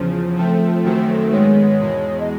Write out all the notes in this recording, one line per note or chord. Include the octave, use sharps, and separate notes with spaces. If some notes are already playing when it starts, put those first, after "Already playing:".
Already playing: E2 C#3 F3 C5
F3 A3 C4
F#2 D#3 F#3 A3 C4
G#2 D#3 G#3 B3 C#5
E2 B2 G#3
D#5